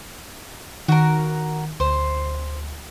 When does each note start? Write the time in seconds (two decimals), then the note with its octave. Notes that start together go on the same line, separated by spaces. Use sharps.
0.88 D#3 F#4 A#4
1.80 D2 C5